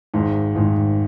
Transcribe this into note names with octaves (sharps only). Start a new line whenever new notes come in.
G#1 G#2 D#3
G#1 G#2 D#3